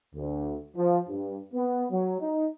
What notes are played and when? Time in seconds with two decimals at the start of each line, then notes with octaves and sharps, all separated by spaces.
0.15 D2
0.76 F3
1.08 G2
1.54 B3
1.91 F#3
2.20 D#4